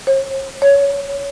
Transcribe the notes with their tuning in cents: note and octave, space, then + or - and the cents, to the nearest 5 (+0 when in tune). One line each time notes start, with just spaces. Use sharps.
C#5 -45
C#5 +20